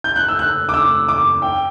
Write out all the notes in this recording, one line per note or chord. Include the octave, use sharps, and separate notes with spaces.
G6
F#6
E6
F#6
D6
E6
D6
G5